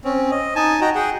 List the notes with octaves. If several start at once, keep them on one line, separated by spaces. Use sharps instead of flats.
C4 C#4
D#5
D#4 G#5 A5
D#4 F#4 D#5 G5 A#5
G#4 F#5 G5